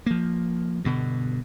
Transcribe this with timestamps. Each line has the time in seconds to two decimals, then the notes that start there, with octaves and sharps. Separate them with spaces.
0.06 F3 A#3
0.84 G2 B2 D3